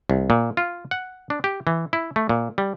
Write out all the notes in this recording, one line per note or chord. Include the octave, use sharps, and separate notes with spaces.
C2
A#2
F4
F#5
D4
G4
E3
E4
A3
A#2
G3